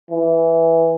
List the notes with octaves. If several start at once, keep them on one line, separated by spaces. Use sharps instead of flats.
E3